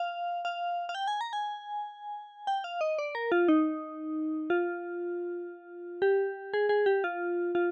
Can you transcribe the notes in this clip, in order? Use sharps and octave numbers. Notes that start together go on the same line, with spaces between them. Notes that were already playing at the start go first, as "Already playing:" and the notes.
Already playing: F5
F5
F5
G5
G#5
A#5
G#5
G5
F5
D#5
D5
A#4
F4
D#4
F4
G4
G#4
G#4
G4
F4
F4